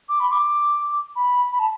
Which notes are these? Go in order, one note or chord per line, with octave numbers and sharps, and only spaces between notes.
D6
B5
D6
B5
B5
A5